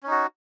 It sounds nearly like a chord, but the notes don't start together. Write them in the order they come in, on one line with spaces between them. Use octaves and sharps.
C#4 D#4 F#4